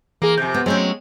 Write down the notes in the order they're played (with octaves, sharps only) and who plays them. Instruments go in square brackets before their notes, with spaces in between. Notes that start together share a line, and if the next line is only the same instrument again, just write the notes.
[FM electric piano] E3 G#4 [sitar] A#3
[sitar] F2 C3 [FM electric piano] G6
[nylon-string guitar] B3
[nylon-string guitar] F#3 A3 C#4 [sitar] G#3 C4